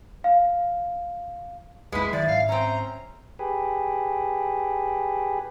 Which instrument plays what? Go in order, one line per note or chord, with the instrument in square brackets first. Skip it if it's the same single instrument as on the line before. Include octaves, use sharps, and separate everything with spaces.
[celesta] F5
[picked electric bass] C2 F#2 A3 [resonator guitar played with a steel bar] G#3 E4 [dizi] B4
[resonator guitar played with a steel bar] F#2 [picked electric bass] D#3 [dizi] D5 [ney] E5
[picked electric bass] G#2 [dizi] F5
[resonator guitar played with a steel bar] C4 C#4 [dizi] A#5
[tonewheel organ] G4 G#4 B4